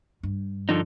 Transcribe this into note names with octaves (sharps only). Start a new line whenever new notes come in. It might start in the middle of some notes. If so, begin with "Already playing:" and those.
G2
D3 F3 D#4